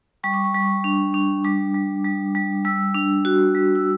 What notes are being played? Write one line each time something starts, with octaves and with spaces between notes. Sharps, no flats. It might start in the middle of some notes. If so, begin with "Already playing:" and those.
G3 C#6
D6
C#6
G3
D4
D4
G3 D6
G3
G3
G3
G3 E6
D4
F#4
G3
E6